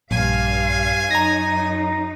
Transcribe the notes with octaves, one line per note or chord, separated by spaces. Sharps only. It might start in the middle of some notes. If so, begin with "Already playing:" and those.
A#1 G2 F5 G#5
F#2 D#4 A#5 A#6